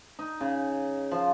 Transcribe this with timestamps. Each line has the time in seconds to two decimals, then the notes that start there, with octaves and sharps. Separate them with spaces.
0.19 D#4
0.41 C#3
1.11 F3